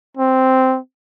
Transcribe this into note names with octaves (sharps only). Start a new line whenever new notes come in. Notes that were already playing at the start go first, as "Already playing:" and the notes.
C4